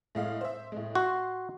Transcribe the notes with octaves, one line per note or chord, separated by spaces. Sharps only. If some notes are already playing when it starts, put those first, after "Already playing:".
A2 G#3 F5
C5 E5
A2 G#3
F#4 C6